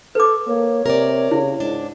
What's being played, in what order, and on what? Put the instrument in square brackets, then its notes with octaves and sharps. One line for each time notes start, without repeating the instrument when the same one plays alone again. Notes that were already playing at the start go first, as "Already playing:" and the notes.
[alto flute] A4 [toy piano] B4 D6
[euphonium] A#3 [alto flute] C#5
[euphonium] C3 [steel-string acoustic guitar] A#4 D5
[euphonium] C#3 [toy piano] E4
[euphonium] G#2 [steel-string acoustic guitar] D4